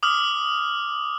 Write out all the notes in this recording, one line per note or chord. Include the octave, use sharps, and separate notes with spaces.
D6 D#6 F6